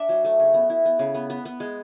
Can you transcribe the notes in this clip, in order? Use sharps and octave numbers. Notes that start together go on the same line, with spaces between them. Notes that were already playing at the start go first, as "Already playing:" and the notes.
Already playing: D4 D5 E5
F#3
A3
C#3
B3
E4
B3
C#3
B3
B3
B3
G#3